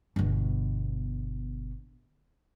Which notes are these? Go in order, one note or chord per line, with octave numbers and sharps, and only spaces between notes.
G1 B2